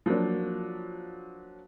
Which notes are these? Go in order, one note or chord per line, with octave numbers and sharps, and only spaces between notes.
F3 F#3 A#3 D4